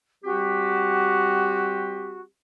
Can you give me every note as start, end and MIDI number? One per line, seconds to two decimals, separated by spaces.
0.24 2.25 55
0.24 2.25 60
0.24 2.20 66
0.24 2.25 67